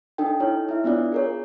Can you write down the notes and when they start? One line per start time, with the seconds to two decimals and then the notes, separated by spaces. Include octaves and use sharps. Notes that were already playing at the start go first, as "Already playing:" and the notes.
0.18 D4 D#4 A4 G5
0.40 D#4 E4 C#5
0.69 E4 E5
0.84 B3 D4 F4 D5
1.12 G#4 A#4 C#5